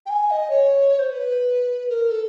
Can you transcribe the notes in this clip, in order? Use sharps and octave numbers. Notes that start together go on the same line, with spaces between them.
G5
G#5
D#5
C#5
C5
B4
A#4
A4